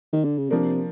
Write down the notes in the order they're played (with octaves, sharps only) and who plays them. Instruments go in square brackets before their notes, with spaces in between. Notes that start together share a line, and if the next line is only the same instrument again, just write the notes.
[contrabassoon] D#3
D3
C#3
[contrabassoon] C3 [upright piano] F3 A#3 D4